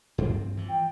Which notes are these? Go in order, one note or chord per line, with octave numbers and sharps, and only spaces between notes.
G2 C4
E3 F3
G5